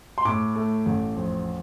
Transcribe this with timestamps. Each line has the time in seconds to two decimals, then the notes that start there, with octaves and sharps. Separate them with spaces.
0.18 C6
0.25 A2 D6
0.55 A3
0.86 A1
1.16 F2